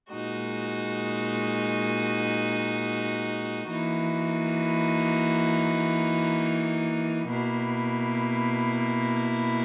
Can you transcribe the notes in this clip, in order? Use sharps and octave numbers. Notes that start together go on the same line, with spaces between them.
A#2 G#3 D#4 F#4
E3 A#3 D#4 F#4
B2 A#3 E4